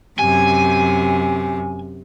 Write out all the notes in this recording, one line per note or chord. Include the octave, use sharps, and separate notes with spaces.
F#2 C3 G#5